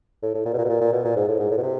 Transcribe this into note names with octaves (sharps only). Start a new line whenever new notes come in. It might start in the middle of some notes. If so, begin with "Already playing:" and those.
A2
A2
A#2
B2
A#2
B2
A#2
A#2
B2
A#2
G#2
A2
G#2
A2
B2
C3